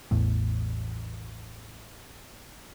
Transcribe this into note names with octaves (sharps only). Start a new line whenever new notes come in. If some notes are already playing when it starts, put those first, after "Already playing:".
A1 E2 A2